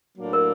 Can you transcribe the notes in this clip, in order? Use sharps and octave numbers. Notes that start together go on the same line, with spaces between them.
A2 F#3 A#3 D4
A#4